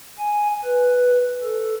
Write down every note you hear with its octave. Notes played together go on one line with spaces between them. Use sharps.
G#5
B4
A4